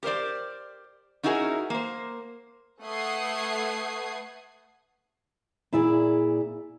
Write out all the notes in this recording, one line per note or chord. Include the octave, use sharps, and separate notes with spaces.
G4 A#4 C5 D5
C#4 D#4 E4 F#4 G#4 A#4
A#3 C5
A3 B4 F#5 D#6 G#6 C7
A#2 E4 G#4 D5